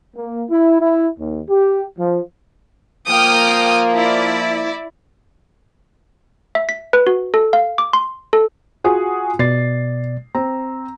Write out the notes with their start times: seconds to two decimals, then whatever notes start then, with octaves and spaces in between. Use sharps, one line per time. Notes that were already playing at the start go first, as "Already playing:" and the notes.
0.16 A#3
0.50 E4
0.80 E4
1.18 D#2
1.49 G4
1.98 F3
3.09 F3 A#3 G5 D#6 F6
3.95 E4 D5
6.55 E5
6.69 B6
6.93 B4
7.07 F#4
7.34 A4
7.53 F5
7.78 D6
7.93 C6
8.33 A4
8.84 F4 F#4 G#4
9.39 B2 D5 A6 C7
10.35 C4 A#5